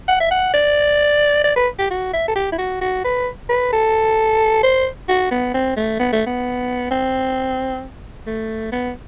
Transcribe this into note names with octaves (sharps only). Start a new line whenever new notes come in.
F#5
E5
F#5
D5
D5
B4
G4
F#4
E5
A4
G4
E4
F#4
F#4
B4
B4
A4
C5
F#4
B3
C4
A3
B3
A3
B3
C4
A3
B3